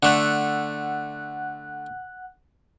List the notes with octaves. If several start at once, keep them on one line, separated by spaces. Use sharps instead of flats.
D3 A3 F#5 F#6